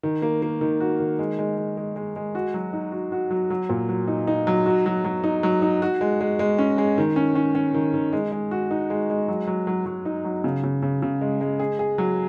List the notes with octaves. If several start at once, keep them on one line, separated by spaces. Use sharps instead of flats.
D#3
A#3
A#3
D#3
F#4
D#3
G#3
G#3
G#3
G#3
G#3
G#3
F#4
F#3
D#4
F#4
F#4
F#3
F#3
A#2
F#3
D#4
D#4
F#3
F#4
F#3
F#3
D#4
F#3
D#4
F#4
G#3
G#3
G#3
C#4
G#3
D#3
C#4
C#4
C#4
D#3
D#3
G#3
G#3
F#4
D#4
G#3
G#3
F#3
F#3
F#3
F#3
D#4
F#3
C#3
C#3
C#3
C#3
G#3
G#3
G#4
G#4
F#3